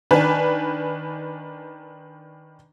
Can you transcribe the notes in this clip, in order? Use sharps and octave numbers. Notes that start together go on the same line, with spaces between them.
D#3 D4 B4 G#5